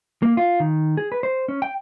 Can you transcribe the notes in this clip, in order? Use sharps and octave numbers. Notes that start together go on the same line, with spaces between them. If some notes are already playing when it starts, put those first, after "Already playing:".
A#3
F4
D#3
G#4
B4
C5
C#4
G5